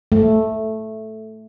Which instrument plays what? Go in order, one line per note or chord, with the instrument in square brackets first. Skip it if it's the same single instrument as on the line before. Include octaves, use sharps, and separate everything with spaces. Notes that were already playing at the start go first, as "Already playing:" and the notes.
[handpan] A3